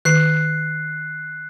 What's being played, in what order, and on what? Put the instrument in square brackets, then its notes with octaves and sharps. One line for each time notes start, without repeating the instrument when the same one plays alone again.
[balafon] D#3 [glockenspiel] F#6 C7